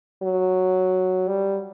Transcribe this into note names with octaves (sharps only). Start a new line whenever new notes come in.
F#3
G3